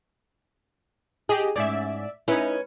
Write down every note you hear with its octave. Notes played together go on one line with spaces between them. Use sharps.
G4 G#4 D#5
G#2 C#4 D5 E5
C#4 D#4 E4 B4